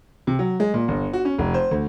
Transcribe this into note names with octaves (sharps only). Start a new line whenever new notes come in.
C3
F#3
G#3
A#2
G1
F#4
C#4
F1
C5
D2